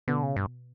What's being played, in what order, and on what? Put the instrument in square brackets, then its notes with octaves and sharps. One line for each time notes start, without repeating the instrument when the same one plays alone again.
[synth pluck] B2 B3 [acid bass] D3
[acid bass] C#3
G2